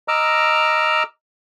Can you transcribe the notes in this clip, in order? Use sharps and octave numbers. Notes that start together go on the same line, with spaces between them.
D#5 A#5 D6 E6 F6